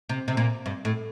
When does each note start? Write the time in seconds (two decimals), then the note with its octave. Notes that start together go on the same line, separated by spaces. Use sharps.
0.09 C3
0.28 C3
0.37 A#2
0.66 G2
0.85 A2